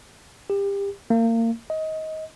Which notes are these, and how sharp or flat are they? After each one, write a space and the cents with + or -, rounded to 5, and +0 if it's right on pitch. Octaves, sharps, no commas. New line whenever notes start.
G4 +25
A#3 -30
D#5 +20